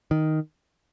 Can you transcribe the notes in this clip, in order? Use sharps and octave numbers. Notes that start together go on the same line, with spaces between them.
D#3